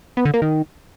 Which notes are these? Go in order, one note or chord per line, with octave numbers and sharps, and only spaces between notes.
B3
D3
A#3
D#3